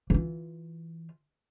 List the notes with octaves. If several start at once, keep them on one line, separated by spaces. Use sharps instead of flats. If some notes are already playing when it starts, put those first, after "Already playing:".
E3 F4